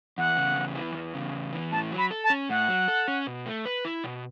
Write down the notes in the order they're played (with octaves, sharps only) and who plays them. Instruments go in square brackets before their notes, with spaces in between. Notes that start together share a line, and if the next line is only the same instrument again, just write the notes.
[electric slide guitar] E2 [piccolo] F#5
[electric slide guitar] C#3
E2
E3
E2
C#3
E2
E3
[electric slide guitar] A2 [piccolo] A5
[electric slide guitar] F#3
[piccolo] B5
[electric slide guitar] A4
[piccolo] A5
[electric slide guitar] C#4
[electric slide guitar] A2 [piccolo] F#5
[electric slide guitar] F#3
A4
C#4
B2
A3
B4
E4
B2